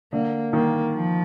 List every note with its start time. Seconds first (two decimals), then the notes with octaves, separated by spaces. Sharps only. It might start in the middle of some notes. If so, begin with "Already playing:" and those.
0.13 D3 A#3
0.53 D#3 A#3
0.94 F3